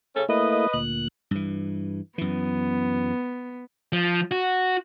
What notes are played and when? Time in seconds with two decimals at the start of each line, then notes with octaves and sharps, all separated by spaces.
0.16 C#3 C#4 A4
0.29 A3 A#3 E4 B4 D#5
0.73 D2 A#2 F#6
1.31 G2 E3
2.18 F#2 E3 B3
3.92 F3
4.31 F#4